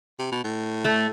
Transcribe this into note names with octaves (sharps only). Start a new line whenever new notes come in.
C3
B2
A2
A3